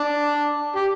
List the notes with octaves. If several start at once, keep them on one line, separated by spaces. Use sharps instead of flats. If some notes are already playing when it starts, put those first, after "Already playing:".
Already playing: D4
G4